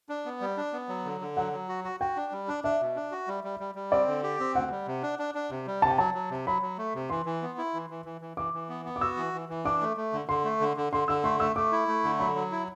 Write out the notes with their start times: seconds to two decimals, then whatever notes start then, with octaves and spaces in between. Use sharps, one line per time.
0.09 D4
0.25 B3
0.41 G3
0.57 D4
0.73 B3
0.89 F#3
1.05 D3
1.21 D3
1.37 F#3 F#5
1.53 F#3
1.69 F#4
1.84 F#4
2.00 F#4 G5
2.16 D4
2.32 G3
2.48 D4
2.64 D4 E5
2.80 B2
2.96 D4
3.12 F#4
3.28 G3
3.44 G3
3.60 G3
3.75 G3
3.92 C4 D5
4.07 D3
4.23 G4
4.40 C4
4.55 D2 F#5
4.71 G3
4.87 C3
5.03 D4
5.19 D4
5.35 D4
5.51 C3
5.67 G3
5.82 C3 A5
5.91 G5
5.98 F#3 A5
6.14 F#3
6.30 C3
6.47 F#3 B5
6.62 F#3
6.78 A3
6.94 C3
7.10 E3 C6
7.26 E3
7.42 B3
7.58 E4
7.74 E3
7.90 E3
8.05 E3
8.21 E3
8.37 E3 D6
8.54 E3
8.69 B3
8.85 B3
8.96 D6
9.01 F#4 E6
9.17 E3
9.33 E3
9.49 E3
9.65 D4 D6
9.81 A3
9.97 A3
10.13 D3
10.28 D3 C6
10.44 A3
10.60 D3
10.77 D3
10.93 D3 C6
11.08 D3 E6
11.24 A3 C6
11.40 A3 E6
11.56 A3 D6
11.72 E4
11.88 A3
12.04 D3
12.20 F#3 B5
12.36 F#3
12.51 E4